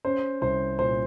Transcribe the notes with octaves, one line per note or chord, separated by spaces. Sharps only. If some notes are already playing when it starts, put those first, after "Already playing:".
C#4 C5
C2 C5
A#2 C5